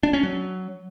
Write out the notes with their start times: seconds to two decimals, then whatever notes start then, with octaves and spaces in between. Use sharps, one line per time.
0.03 D4
0.13 C#4
0.23 F#3